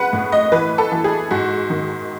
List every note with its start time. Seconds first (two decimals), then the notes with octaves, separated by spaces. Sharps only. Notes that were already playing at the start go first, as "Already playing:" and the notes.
Already playing: G#3 B4 F#5
0.13 A2
0.32 D#5
0.52 E3 B4
0.78 A4
0.92 E3
1.04 G#4
1.31 G#2 F#4
1.70 D#3